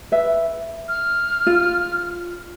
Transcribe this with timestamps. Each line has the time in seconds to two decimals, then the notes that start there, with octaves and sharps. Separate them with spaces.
0.12 B4 E5
0.88 F6
1.46 F4